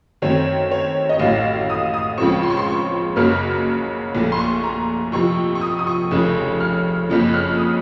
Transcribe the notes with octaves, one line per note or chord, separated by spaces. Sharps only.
F#2 D#3 A3 C4 C#5
C#5
D#5
A1 A2 F#3 F5
D#6
D#6
C#2 C#3 F3 C4 C#6
C6
C#6
C6
C#6
F#1 F#2 C#3 F#3 A#3 F6
A#1 A#2 A3
C6
C#6
A#5
F2 C3 F3 C#6
C#6
D#6
D#6
C#6
F1 F2 C#3
F6
F#1 F2 C#3 F3
F#6
F6
D#6